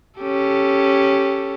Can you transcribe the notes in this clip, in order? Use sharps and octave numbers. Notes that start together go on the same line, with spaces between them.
C#4 G4 A4